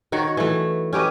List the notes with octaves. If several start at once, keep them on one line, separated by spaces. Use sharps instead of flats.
D#3 F#4 C#5 F#5
E3 A3
C#4 G4 B4 D#5